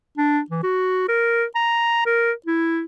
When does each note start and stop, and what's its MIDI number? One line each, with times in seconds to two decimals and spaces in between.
0.18 0.41 62
0.50 0.63 52
0.63 1.08 66
1.08 1.45 70
1.55 2.03 82
2.06 2.32 70
2.46 2.85 64